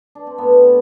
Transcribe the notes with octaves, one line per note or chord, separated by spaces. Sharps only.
D4
C4
A2 B3